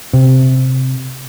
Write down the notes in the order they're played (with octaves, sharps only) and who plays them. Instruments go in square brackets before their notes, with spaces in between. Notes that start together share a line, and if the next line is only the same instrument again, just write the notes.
[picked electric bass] C3